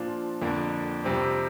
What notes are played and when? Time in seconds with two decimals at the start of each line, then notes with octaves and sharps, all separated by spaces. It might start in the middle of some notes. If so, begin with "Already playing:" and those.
Already playing: A#2 F3 D4 F4
0.42 F2 D3 A#3 D4
1.04 F2 C3 G3 C4